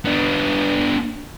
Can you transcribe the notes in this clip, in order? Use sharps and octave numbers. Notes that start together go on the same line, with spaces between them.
B3 D4